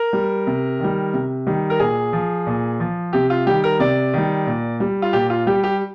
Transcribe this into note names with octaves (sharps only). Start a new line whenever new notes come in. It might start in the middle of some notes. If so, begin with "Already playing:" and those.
Already playing: A#4
G3
C3
D#3 G3
C3
D#3 G3
A#4
A#2 G#4
F3
A#2
F3
C3 G4
F4
D#3 G3 G4
A#4
C3 D5
D#3 G3
A#2
G3
F4
A#2 G4
F4
G3 G4
G4